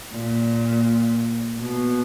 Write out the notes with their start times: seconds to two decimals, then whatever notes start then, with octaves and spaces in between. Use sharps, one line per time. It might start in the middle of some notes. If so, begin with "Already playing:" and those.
0.12 A#2
1.59 B2